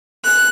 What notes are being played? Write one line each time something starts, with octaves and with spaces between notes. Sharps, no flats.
F#6